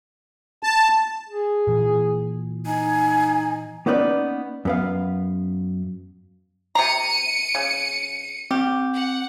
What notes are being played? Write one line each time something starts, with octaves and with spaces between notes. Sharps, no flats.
A5
G#4
A#2 E3
D#4 G#5
A#3 B3 C#4 D#4 B4 D5
F#2 B3 F5
C3 A#5 C#7 D#7
C#3
C4 G4
F#5